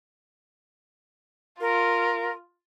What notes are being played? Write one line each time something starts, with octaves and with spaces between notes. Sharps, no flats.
F4 A#4